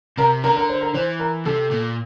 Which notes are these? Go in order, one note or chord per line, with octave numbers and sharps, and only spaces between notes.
C3 A#4
D3 A#4
A#4
C5
A#4
E3 C5
A#4
C3 A4
A#2